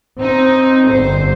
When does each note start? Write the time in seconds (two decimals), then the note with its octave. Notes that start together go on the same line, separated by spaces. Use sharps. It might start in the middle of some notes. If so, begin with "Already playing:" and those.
0.21 C4 D#4
0.90 G1 C5